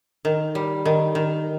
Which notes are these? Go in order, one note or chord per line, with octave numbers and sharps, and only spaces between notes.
D#3
G3
D#3
D#3